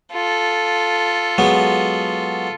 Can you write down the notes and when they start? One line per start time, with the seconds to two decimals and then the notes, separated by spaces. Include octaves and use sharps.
0.13 F4 A4
1.38 F#3 G#3 B3